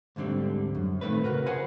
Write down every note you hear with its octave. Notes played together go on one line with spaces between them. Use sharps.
D2 G#2 D3 G3 C4
F#2
A#2 D#3 F#3 A3 C4 B4
C#3 F#4 A#4 B4
G#4 C5 F#5 G#5 B5